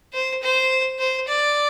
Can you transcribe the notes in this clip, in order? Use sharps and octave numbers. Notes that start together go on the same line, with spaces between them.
C5
C5
C5
D5